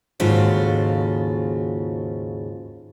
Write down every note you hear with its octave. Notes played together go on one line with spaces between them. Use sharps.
D#2 G#2 C#3 F4 F#4 A4